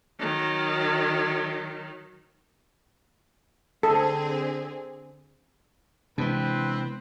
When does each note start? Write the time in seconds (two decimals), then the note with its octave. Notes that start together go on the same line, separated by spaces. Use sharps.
0.20 D#3 F#3
3.83 D3 C4 G#4 A4
6.18 C3 E3 G#3 B3 C4 D4 B4